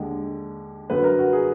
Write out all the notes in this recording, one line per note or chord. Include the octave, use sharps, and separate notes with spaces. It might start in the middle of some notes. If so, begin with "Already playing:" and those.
Already playing: D#2 D3 G#3
F#2 D3 F#3 B3 B4
A#4
F#4
G#4